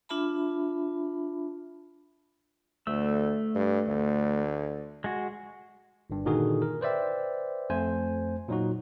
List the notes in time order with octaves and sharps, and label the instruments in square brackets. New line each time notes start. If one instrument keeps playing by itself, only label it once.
[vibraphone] D4 F4 E5 A5 B5
[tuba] D2 [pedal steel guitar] A3 E6
[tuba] G2
D2
[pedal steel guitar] G#3 F#4
[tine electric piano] G1 G2
A#2 D3 D#3 D#4 F#4 G#4
A#4
B4 C5 D5 E5 G5
F2 A3 C5 G#5
A#2 F#3 D#4 F#4